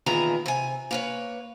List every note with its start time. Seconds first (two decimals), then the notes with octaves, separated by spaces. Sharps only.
0.06 E2 A#2 D#3 E3 G#4 A#5
0.46 C3 G#5
0.91 A#3 B4 C#5